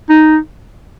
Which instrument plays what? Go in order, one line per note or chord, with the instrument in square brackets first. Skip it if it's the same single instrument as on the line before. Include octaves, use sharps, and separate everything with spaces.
[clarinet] D#4